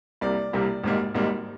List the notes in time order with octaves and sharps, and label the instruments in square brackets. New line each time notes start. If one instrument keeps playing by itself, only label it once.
[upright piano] C2 C3 G3 A#3 D5
C2 C3 G3 A#3
G#1 G#2 G3 A#3
G#1 G#2 G3 A#3